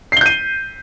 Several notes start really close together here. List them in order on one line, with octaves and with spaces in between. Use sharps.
C7 G7 G6 D#7